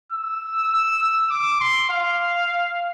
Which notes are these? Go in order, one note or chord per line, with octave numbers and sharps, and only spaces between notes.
E6
E6
E6
D6
C6
F5